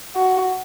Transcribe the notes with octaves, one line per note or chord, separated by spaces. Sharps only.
F#4